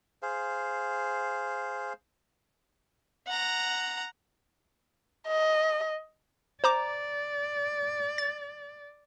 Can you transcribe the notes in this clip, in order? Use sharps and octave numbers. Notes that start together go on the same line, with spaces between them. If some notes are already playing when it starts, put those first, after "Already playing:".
G#4 C5 F5
F#5 A#5
D#5
C5 D5 A#5 D6
A6